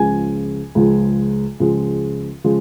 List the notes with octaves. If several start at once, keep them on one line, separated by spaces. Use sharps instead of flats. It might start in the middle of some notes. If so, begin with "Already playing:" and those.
Already playing: C#2 C#3 F3 G#3 G#5
C#2 C#3 F3 G#3
C#2 C#3 F3 G#3
C#3 F3 G#3